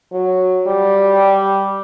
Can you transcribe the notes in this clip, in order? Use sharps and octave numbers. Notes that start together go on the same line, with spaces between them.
F#3
G3